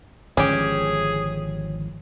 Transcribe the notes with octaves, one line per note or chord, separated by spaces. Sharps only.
G#1 D3 F3 C#4 G4 G#4